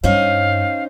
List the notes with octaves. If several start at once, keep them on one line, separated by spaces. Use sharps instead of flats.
G2 C#4 D#4 C5 F5